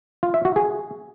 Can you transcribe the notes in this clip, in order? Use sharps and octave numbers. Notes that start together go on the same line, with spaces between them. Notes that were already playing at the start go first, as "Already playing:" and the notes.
F4
E5
F#4
G#4